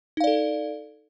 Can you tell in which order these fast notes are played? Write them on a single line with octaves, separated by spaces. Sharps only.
D#4 F5 D5 A4